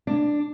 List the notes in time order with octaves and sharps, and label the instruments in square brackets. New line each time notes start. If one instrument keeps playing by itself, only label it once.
[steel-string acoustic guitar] D4